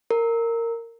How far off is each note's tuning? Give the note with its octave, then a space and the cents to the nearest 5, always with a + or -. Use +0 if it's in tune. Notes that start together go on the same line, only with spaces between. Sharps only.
A#4 -15